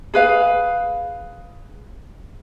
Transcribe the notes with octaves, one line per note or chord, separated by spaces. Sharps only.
G#4 B4 F5